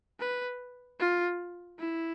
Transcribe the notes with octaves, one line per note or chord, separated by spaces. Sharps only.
B4
F4
E4